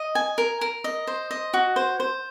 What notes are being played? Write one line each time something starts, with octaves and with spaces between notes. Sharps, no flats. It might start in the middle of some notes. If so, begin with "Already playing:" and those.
Already playing: D#5
G#5
A#4
A#4
D#5
C5
D#5
F#4
C5
C5